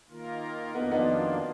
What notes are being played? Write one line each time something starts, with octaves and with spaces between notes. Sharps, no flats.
D#3 A#3 F4 A#4
F2 D#3 A#3 B3 D4 D#4 F4
B3 D#4